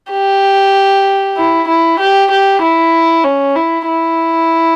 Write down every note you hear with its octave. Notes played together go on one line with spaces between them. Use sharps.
G4
E4
E4
G4
G4
E4
C#4
E4
E4